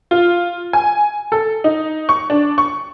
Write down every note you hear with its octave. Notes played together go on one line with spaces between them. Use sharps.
F4
G#5
A4
D#4
C#6
D4
C#6